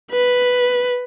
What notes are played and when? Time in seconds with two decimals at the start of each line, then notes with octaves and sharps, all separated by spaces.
0.11 B4